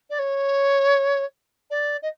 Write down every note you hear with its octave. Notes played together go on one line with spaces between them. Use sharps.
D5
C#5
D5
D#5